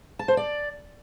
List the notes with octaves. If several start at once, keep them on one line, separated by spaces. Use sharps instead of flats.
A5
C5
D5